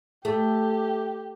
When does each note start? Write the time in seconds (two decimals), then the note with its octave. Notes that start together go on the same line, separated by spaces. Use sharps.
0.25 A3 G4